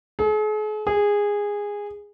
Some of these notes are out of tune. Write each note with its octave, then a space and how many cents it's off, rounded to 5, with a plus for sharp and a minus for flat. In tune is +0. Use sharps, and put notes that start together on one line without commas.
G#4 +45
G#4 -15